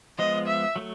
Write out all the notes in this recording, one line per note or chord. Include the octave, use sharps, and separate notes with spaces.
F3 G#3 B3 D#5
E5
F#3 A3